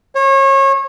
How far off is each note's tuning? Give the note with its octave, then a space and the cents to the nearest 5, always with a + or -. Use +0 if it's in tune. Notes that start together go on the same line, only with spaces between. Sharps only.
C#5 -30